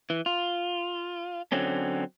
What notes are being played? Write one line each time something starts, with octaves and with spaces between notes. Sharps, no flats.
E3
F4
D3 F#3 C4 C#4